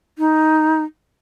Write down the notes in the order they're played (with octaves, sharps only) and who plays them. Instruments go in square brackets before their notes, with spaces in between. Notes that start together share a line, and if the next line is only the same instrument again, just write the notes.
[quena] D#4